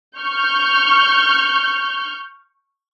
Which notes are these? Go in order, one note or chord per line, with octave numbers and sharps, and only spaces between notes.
C#6 F6 G6